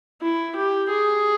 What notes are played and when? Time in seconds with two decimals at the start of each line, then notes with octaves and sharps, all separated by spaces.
0.22 E4
0.56 G4
0.90 G#4